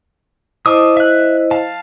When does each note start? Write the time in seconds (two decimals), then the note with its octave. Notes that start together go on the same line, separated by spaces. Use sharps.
0.66 E4 C5 D#5 A5 D6 D#6
0.97 E5 F#6
1.51 F5 A5